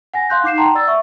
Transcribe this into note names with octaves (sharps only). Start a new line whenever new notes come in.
F#5 G#5 A#6
F5 C6 F#6 G6
D#4 D6 C7 E7
F#5 G5 A5 A#5 C6
D5 E6 A6
E5 C#6